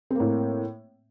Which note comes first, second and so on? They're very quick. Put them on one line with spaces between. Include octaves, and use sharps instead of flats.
C4 A#3 A2